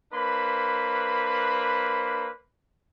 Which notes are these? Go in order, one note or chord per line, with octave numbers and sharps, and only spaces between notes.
A#3 D4 B4 C5 B5